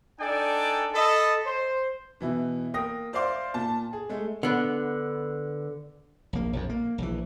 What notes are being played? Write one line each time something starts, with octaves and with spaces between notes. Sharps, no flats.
D4 D#4 A4 D5 G5 G#5
A4 D#5 B5
C5
B2 E3 E4
A#3 G5 D#6 A#6
C5 D5 E5 F5 C6 D6
A#2 A5
G#4
G#3 A3
D3 B3
A#1 A#3
A#1 F2
A#3
A#1 E3